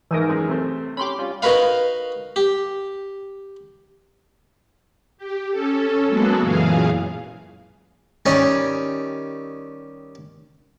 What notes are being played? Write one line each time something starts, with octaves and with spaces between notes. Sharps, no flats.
E2 G#2 E3 D#4 A#4
F#2 G#3
C3 A3 C4
C#4 G4 B5 C6 D6
G3 C#4 F4
D#4 F#4 A#4 B4 F5
G4
G4
C#4 A4
F#3 G#3 A#3 B3 F#4 A4
F#2 A#2 C#3 E3 G#4 F5
D#3 G3 C#4 G#5